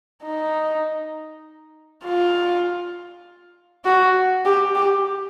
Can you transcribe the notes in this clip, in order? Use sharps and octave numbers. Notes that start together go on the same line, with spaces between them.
D#4
F4
F#4
G4
G4